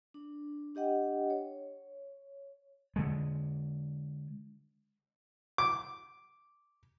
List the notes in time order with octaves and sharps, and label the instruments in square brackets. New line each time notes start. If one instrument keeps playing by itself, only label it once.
[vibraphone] D4
D4 G4 D#5 F#5 G5
C#5
[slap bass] D3 G#3
[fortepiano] D6